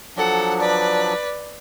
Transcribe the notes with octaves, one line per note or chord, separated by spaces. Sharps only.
F3 F#3 D4 A4 F#5
B4 D5